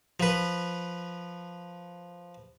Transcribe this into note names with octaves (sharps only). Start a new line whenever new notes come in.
F3 B4